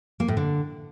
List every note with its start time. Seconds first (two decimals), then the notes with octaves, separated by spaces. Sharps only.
0.20 A#3
0.28 A2
0.37 D3